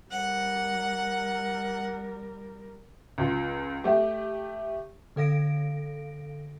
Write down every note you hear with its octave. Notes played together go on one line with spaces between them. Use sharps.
G3 A#4 F#5
C#2 F4
A3 G4
D3 A4 F5 A#6 D7